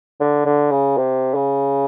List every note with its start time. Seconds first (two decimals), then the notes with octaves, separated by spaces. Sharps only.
0.21 D3
0.46 D3
0.71 C#3
0.97 C3
1.35 C#3